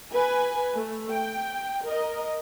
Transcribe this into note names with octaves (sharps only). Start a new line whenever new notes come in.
B4 G#5
A3
G5
A#4 D#5